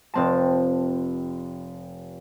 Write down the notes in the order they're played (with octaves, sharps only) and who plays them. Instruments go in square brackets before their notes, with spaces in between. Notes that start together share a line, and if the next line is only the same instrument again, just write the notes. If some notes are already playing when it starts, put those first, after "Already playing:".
[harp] F1 C4 A5